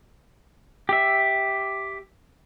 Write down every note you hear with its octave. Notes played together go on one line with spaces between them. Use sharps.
G4 E5